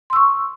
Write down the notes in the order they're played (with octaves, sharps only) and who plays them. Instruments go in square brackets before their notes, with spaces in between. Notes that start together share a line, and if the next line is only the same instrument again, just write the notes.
[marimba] C6
E6
C#6